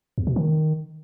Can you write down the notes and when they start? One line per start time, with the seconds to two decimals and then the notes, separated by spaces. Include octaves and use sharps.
0.18 E2
0.27 B2
0.36 D#3